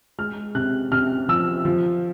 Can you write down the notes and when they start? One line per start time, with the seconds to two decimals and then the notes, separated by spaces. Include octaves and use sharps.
0.18 G#3 F6
0.55 C3 F#6
0.91 C3 F6
1.28 F3 E6
1.65 F3